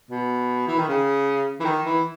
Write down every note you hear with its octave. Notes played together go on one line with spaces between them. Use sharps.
B2
E3
D#3
C#3
E3
D#3
E3